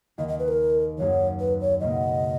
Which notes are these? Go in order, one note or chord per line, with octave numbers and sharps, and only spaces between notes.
D#2 D#3 A#3 D#5
D#5
B4
A#4
F#2 D#3 A#3 D#4 G#4 C#5
B4
C#5
C#2 B2 A#3 D#5